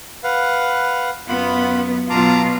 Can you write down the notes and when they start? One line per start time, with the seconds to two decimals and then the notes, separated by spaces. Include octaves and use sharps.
0.24 B4 F5 F#5
1.29 F#2 B3 F4 F#5 B5
2.10 B2 F#3 F4 A5 A#5 D6